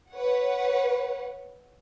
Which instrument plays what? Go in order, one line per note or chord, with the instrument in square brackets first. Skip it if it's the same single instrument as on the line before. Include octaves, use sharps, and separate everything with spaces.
[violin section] B4 C#5 F#5